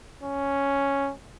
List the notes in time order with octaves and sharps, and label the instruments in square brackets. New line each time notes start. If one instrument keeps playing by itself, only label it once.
[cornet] C#4